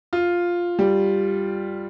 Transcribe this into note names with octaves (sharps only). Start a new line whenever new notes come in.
F4
G3